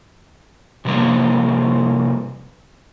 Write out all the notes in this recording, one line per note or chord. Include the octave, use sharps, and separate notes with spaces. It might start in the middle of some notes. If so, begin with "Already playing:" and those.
C3 F3 G3 A#3